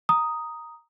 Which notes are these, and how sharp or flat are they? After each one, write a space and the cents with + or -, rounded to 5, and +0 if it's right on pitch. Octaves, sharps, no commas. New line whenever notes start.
A#5 +0 D#6 +0